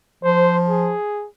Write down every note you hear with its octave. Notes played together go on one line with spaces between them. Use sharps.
F3 C5
G#4